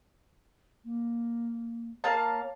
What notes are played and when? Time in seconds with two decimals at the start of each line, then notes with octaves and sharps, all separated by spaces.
0.84 A#3
2.04 A#3 C#5 F5 A5